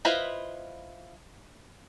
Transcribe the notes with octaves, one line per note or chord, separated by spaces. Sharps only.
E4 F4 B4 C5 D#5